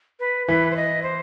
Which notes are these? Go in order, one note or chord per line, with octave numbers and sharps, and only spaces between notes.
B4
E3 B4
C5
D#5
C5